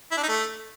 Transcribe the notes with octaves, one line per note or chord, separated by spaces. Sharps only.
E4
D4
D#4
A3